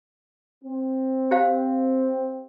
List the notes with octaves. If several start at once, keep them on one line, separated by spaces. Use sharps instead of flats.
C4
G4 C5 F5